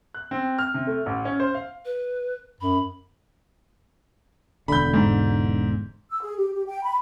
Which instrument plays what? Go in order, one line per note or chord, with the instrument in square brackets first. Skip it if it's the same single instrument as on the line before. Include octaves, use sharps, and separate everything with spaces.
[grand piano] F#6
C4
F6
C3
A3
A1
C#4
C5
F5
[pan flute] B4
[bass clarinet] F#2 [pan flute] B5
[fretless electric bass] E1 D3 [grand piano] B5 G6
[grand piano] G#2
[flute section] E6
G#4
G4
G4
G5
B5